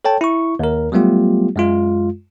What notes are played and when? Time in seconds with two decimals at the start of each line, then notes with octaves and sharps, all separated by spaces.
0.05 A4 C#5 G5 A5
0.21 E4 C#6
0.59 D#2 A#4
0.92 F#3 G3 A3 B3 F4 G4
1.56 F#2 G#3 F4